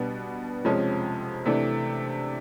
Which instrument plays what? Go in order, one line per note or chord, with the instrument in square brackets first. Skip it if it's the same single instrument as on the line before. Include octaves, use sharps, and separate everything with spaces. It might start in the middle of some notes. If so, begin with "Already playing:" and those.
Already playing: [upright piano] B2 G3 B3 D4
F2 C3 F3 G#3 C#4
C3 E3 A3 D4